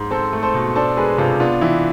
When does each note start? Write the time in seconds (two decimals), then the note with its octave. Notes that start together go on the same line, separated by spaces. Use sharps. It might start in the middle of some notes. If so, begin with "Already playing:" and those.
Already playing: G#2
0.11 C4 A4 C5
0.33 A3
0.43 A4 C5
0.54 B2
0.76 D4 A4 C5
0.97 G#3 G#4 B4
1.18 C3 F4 A4
1.40 B3 D4 F4
1.61 E3 E4